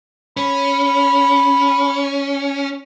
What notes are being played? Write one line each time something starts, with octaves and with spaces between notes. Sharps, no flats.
C#4 B5